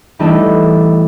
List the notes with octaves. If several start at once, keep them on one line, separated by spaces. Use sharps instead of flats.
E3 G3 A3 D#4 E4 A4